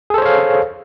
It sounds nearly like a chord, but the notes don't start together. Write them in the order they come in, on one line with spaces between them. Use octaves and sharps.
G#4 A4 C5 C#5 F5